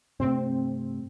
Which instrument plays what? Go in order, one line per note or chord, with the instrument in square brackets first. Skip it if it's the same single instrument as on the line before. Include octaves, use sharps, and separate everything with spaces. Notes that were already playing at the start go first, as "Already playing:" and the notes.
[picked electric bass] G2 C3 A3 [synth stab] C4